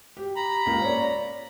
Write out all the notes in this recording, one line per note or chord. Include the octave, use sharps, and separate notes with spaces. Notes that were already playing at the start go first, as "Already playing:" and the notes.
G4
A#5 B5
C#2 A#3 F4
C#5 D5